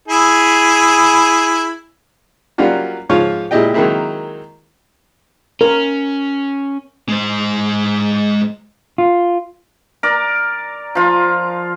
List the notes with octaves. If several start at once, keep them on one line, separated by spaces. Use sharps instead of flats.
E4 G#4
F#3 G3 A#3 C#4 F4 F#4
G#2 F3 F4 C#5
A#2 G#3 E4 G4 D#5 G5
D#3 F#3 G#3 A#3 C4 E4
C#4 A#4
G#3 C5
F4
A#4 D5
F3 F4